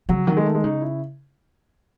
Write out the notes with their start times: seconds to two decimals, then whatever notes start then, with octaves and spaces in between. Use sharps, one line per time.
0.09 C#3 F#3
0.27 D#3 F#3
0.37 G#3
0.46 A3
0.55 G#3
0.64 C#3 D#4
0.82 E4